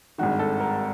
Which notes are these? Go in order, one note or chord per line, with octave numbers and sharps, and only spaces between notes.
G#1 G2 D#3 F#4
A4
A#4